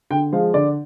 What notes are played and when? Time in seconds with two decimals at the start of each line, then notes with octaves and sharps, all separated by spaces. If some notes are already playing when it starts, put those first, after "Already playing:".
0.10 D3 G5
0.32 F3 G#3 F5
0.54 D3 D5